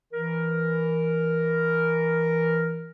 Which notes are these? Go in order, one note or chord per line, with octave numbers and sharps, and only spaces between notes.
E3 A#4